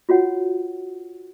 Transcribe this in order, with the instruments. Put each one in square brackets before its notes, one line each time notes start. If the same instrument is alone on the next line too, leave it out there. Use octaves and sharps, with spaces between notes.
[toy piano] F4 F#4 C#5 F#5